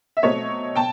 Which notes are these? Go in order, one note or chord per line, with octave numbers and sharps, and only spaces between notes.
E5
B2 F#3 A3 C4 C#5 D#5
B2 G5 A5